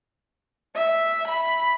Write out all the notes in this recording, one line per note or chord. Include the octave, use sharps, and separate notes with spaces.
E5
B5